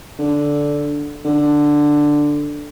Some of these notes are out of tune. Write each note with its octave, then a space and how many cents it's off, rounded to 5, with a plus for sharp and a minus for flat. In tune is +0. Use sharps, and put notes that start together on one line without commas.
D3 -10
D3 +5